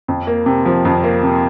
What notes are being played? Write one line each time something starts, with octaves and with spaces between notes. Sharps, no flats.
F2
A#3
C3
F3
F2
A#3
C3